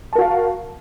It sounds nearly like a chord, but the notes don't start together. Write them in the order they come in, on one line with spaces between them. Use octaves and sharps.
A5 A#4 F#4 F5